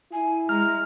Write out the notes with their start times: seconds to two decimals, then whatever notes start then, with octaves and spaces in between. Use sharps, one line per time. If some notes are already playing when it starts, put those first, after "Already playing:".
0.12 E4 G#5
0.49 G#3 A#5 F6